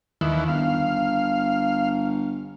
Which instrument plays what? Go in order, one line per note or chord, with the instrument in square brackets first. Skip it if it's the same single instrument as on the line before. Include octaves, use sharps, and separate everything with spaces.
[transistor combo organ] D#2 E3 [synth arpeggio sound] D#3
[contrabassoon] G1 [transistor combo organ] F5